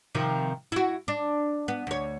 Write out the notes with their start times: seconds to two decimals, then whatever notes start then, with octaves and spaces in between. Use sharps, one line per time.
0.15 C3 D#3 F3
0.72 E4 F#4
1.08 D4
1.68 B3
1.87 D2 C#5